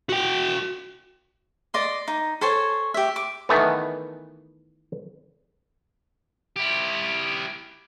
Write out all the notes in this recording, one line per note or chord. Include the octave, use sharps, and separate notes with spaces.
F#4 G5
D5 D#5 C6
D#4
A4 C5 C#5 G#5
G4 E5
D6
D#3 E3 A3 B3
E4 G4